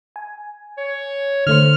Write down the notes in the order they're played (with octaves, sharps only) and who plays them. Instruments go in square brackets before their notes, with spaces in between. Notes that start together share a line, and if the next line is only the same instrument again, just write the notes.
[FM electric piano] G#5
[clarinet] C#5
[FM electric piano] D3 A3 C5 [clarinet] F6